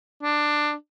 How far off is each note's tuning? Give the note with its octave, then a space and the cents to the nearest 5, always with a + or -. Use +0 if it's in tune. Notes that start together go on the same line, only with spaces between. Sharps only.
D4 +15